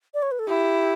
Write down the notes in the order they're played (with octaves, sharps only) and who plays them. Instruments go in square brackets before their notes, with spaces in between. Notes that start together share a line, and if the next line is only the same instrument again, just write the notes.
[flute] D5
C#5
B4
A4
[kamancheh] E4 [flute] G4